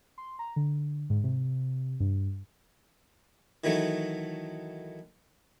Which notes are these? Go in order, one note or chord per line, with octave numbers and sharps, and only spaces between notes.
C6
A#5
D3
G#2
C3
G2
D#3 E3 F#3 A3